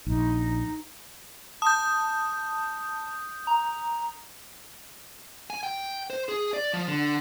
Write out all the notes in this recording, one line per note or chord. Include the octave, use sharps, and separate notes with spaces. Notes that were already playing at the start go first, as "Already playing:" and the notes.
A#1 D#4
A5 D#6 G6
A#5
G#5
G5
C5
G#4
D5
F3
D3